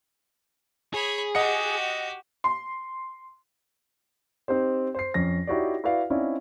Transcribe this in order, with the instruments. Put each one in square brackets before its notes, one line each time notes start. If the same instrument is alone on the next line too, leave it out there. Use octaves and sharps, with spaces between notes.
[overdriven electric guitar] G#4 [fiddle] C#5 B5
[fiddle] F#4 G4 [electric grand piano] D#5 F#5 C#7
[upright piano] C6
[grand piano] C4 D#4 G4 C5
C5 C7
F2 C#4 A#6
D#4 E4 F#4 G4 C#5 D5
E4 F#4 B4 D5 F5
C4 C#4 D#4 E4 D5 F5